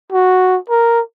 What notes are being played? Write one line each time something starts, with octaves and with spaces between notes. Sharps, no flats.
F#4
A#4